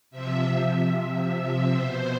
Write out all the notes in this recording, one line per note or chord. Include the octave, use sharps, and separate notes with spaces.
C3 F3 E5
B2 C5